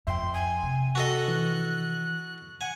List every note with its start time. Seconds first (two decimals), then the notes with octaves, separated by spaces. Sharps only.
0.07 F2 E5 G5 C6
0.33 G#5
0.63 C3
0.95 F#4 A4 D#5 F#6
1.28 E3
2.61 F#5 G#5